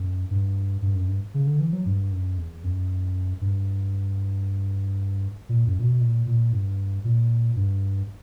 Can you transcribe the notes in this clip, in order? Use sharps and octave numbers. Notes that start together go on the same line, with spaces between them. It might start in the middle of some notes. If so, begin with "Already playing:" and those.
Already playing: F#2
G2
G2
F#2
G2
C#3
D3
E3
F#3
G2
F#2
E2
F#2
G2
A#2
F#2
A#2
B2
A#2
A#2
G2
A#2
G2